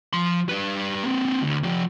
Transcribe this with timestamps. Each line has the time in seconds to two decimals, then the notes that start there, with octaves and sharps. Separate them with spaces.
0.13 F3 C6
0.49 G3 B4
1.03 A#3 C4
1.42 D2 D3
1.63 F3 G4